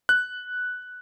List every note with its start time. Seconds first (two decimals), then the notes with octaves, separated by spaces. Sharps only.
0.09 F#6